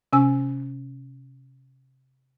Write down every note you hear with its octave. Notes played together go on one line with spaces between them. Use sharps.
C3 C#4 G#5 E6